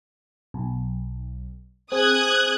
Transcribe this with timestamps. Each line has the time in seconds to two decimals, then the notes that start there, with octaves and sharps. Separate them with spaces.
0.54 B1
1.92 C4 G#4 D#6 F#6 G#6